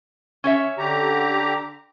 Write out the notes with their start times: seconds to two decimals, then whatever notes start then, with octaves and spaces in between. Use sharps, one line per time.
0.44 C#4 C#5 E5
0.78 D3 G4 A#5